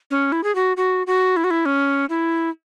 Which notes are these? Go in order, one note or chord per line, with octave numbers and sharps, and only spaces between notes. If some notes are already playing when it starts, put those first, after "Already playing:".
C#4
E4
G#4
F#4
F#4
F#4
E4
F#4
E4
C#4
E4